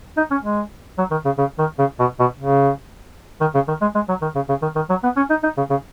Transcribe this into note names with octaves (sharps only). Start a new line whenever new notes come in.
D#4
C#4
G#3
F#3
D#3
C#3
C#3
D#3
C#3
B2
B2
C#3
D#3
C#3
D#3
G#3
G#3
F#3
D#3
C#3
C#3
D#3
D#3
F#3
B3
C#4
D#4
D#4
C#3
C#3